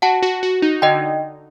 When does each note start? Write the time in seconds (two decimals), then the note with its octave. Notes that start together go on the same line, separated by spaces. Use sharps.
0.02 F#4 F#5 A5
0.22 F#4
0.43 F#4
0.62 D#4
0.82 D3 D#5 G5